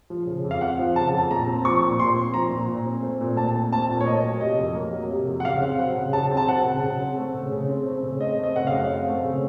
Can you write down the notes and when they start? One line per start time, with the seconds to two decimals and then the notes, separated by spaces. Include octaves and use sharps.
0.10 F3
0.26 C#3
0.44 F2
0.51 F5
0.61 C4 F#5
0.79 F3
0.96 C#3 A5
1.13 F2
1.18 A5
1.31 A#2 A#5
1.47 C4
1.65 F3 C#6
1.82 A#2
1.99 A#2 C6
2.16 C4
2.34 F3 A#5
2.51 A#2
2.68 A#2
2.86 C4
3.02 A3
3.21 A#2
3.37 A#2 A5
3.55 C4
3.72 A3 A5
3.89 A#2
4.01 C#5
4.06 A#3 D#5
4.24 F#3
4.41 C3 D#5
4.58 F2
4.75 A#3
4.93 F#3
5.09 C3
5.27 F2
5.40 F#5
5.45 C#3 F5
5.62 C4
5.79 F#3 F#5
5.96 C#3
6.13 C#3 A5
6.31 C4
6.37 A5
6.48 F#3 F#5
6.65 C#3
6.83 C#3
7.00 C4
7.17 A3
7.34 C#3
7.51 C#3
7.69 C4
7.86 A3
8.03 C#3
8.20 C4 D#5
8.38 A3
8.44 D#5
8.55 C#3 F#5
8.67 F#2 F5
8.90 C4
9.07 A3
9.24 C#3